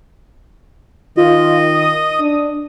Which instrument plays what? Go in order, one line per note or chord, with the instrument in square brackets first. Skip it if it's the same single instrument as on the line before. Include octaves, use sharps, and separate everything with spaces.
[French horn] D#3 [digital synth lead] F4 [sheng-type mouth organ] D#5
[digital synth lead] D#6
[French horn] D4